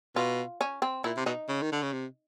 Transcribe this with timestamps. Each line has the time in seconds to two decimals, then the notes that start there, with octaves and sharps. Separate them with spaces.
0.16 B2 F4
0.61 C#4
0.82 C4
1.04 A#2 E4
1.17 C3
1.26 B2 D#4
1.48 C#3
1.62 D#3
1.72 D3
1.83 C#3
1.93 C3